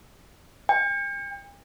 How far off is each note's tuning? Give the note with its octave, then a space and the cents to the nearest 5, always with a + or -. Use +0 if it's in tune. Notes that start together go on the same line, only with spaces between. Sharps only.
G5 +40